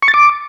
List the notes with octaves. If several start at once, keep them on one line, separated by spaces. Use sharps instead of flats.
C#6
A6
D6